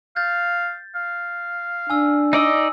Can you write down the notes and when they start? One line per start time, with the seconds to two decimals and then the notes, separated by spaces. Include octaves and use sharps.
0.16 F5 G6 A6
0.95 F5
1.90 D4 G#5 E6
2.33 D#4 D5 D#5 D#6 E6